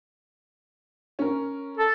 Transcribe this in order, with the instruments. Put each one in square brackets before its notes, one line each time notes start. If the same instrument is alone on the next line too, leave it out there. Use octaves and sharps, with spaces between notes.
[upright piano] C#4 A#4
[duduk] A4